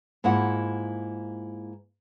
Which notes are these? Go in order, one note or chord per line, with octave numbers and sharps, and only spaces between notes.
G#2 A#3 E4 F4 F#5